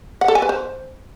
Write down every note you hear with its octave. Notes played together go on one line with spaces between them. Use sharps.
F#5
A4
G#5
B4
C5